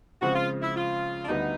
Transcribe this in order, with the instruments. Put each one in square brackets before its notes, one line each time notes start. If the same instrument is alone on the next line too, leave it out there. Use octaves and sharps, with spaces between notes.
[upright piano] C#3 F3 G#3 C4 [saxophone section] F#4
[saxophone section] F4
E4
F4
D4
[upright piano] D2 D3 G3 B3 [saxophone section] D#4